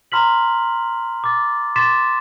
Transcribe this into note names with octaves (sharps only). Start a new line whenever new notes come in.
A#5 C6 F6 B6 F#7
D6 A6
C6 D6 A6 B6 E7